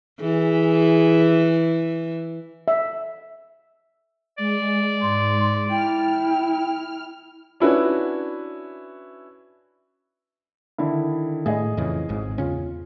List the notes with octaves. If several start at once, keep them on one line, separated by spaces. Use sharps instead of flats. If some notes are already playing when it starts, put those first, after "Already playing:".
E3 G#4
E5
G#3 D5
G#2 C6
E4 G5 F6
C#4 D4 E4 F#4 B4
D3 D#3 E4
A2 A3 G#4 D#5
F2 C#3 E3
G#1 G#2
E2 C#3 C#4 F4